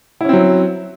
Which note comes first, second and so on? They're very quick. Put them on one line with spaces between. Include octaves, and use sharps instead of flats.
E4 C#4 C4 F#3